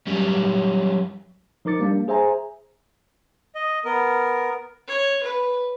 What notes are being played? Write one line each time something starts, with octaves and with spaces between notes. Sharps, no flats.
F#2 G3
F3 D#4 A#4 D6 A6 C#7
G3 A#3 D4
G#4 C5 E5 G#5 A#5
D#5
B3 A#4
C#5
B4